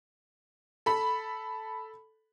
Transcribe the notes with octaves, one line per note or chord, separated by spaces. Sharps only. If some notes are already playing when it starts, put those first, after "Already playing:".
A4 B5